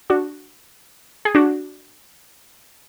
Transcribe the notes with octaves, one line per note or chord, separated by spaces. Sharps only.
D4 F#4
G#4
D4 F#4